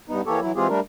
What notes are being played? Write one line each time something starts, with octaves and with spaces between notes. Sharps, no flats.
G2 B3 D#4
E3 A#3 G4 A4 C#5
E3 F#3 E4
E3 G#3 C4 F4 G4 G#4
G3 A3 D4 A#4